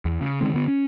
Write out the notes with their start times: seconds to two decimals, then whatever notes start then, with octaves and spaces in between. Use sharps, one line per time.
0.05 E2
0.21 C#3
0.41 D3 D#3 G#3 C4
0.54 D3 B3
0.68 C#4